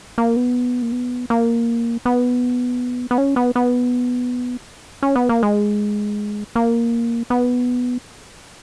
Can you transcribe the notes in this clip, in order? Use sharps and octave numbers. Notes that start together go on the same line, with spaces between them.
A#3
B3
A#3
B3
A#3
B3
B3
C#4
B3
B3
C#4
B3
A#3
G#3
A#3
B3